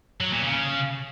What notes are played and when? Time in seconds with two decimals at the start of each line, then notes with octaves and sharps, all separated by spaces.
0.21 F#3
0.32 A#2
0.43 C#3